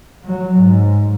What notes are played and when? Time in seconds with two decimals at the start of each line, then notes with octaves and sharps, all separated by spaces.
0.25 F#3
0.60 G#2